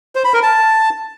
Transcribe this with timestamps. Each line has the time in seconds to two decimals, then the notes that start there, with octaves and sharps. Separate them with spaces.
0.15 C5
0.25 B5
0.34 A#4
0.43 A5